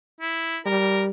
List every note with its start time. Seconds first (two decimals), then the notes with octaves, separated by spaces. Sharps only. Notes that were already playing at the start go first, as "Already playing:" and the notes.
0.21 E4
0.66 G3 A#4